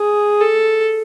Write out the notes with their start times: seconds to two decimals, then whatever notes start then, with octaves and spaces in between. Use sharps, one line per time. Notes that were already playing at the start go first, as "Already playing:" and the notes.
Already playing: G#4
0.41 A4